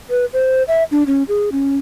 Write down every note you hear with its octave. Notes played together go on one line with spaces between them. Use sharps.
B4
C5
E5
D4
C#4
G#4
C#4